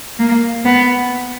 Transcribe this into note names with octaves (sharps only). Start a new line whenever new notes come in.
A#3
B3